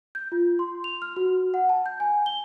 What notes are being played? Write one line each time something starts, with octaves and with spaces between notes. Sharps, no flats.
G6
F4
C6
F7
F6
F#4
F#5
A5
G6
G#5
G7